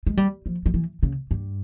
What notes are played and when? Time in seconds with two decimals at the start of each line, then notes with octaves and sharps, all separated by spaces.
0.07 G#3
0.17 G3
0.46 F3
0.66 F3
0.74 E3
1.03 C#3
1.31 G2